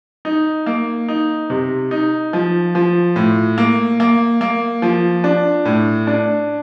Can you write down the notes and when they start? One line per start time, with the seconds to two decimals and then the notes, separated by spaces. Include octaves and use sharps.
0.25 D#4
0.66 A#3
1.08 D#4
1.50 C3
1.91 D#4
2.33 F3
2.75 F3
3.16 A2
3.58 A#3
4.00 A#3
4.41 A#3
4.82 F3
5.24 D4
5.65 A2
6.07 D4